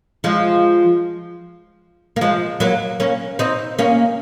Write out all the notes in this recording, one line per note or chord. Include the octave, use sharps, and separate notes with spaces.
F3 G#3
A#3
F3 G#3
F#3 A#3
A#3 C#4
C4 D#4
A#3 C#4